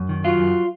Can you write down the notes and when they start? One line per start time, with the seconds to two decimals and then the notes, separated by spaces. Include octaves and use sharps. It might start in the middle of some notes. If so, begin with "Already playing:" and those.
Already playing: F#2
0.09 D#3
0.24 F#3 F4
0.39 F#2